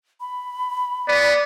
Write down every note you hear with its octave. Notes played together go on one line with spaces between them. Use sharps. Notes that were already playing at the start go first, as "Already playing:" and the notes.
B5
B3 D5